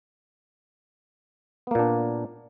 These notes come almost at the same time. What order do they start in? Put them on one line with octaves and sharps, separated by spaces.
B3 A#3 A#2 D4